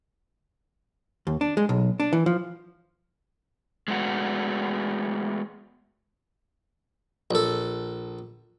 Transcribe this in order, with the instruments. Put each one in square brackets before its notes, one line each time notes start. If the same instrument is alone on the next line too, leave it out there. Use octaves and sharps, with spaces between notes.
[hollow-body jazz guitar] D#2
D4
G#3
B1
D4
E3
F3
[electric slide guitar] G#3 A3 B3 F#4
[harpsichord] A#1 A4